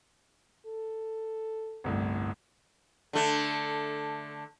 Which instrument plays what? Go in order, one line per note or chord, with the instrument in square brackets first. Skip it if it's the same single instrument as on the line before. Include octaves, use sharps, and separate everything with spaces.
[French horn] A4
[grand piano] G1 C2 A2
[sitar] D3 A3